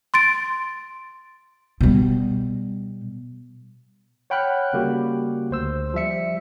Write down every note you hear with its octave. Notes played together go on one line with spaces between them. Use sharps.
C6 A6 D7
B2 G3
C#5 F#5 G5 B5 F6 F#6
C#3 G3 A#3 F#4 G4
D2 C5 E6
F3 G3 E5 C#7